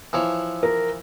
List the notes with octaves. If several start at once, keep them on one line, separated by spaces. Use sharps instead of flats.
E3 F3 C#5
A#4